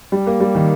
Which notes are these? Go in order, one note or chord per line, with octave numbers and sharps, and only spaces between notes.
G3
A#3
G3
D#3